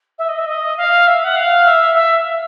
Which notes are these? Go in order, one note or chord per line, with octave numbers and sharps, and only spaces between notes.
E5
D#5
E5
D#5
F5
E5
F#5
F5
E5
E5